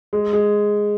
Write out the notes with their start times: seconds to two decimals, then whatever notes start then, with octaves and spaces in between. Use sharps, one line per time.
0.13 G#3
0.33 G#3